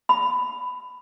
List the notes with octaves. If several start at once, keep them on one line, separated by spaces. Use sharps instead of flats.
B5